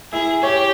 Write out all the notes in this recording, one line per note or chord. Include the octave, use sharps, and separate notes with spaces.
E4 G#4
G4 C#5